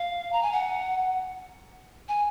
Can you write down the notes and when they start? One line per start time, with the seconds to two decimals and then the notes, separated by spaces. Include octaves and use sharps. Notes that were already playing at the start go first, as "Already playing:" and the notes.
Already playing: F5
0.33 A#5
0.43 G#5
0.52 F#5
2.09 G#5